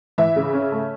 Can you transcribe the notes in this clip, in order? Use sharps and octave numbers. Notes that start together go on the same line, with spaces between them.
E3 E5
C#3
C#4
A3